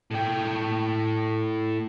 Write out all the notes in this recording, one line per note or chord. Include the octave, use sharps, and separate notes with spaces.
A2 G5